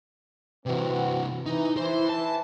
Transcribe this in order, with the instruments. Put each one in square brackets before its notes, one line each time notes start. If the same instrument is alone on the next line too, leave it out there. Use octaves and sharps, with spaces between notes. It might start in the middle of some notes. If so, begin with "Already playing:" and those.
[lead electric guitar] C3 E3 [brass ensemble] C4 F#4 B4
[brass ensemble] E3 [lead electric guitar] D#4
[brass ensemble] E3 [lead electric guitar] C5
[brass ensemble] E3 [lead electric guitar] A5